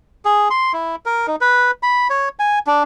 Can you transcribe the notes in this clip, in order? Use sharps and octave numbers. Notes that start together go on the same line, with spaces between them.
G#4
C6
E4
A#4
D#4
B4
B5
C#5
G#5
D4